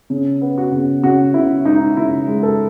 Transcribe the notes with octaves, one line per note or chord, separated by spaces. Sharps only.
C#3
B3
F#4
C#3
C#3 F#4
C#3 E4
G#3 D#4
C#3 E4
G#3
A4